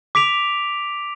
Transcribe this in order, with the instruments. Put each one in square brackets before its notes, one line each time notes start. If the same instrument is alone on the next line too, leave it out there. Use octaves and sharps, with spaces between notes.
[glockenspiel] D6 B6 D7 F7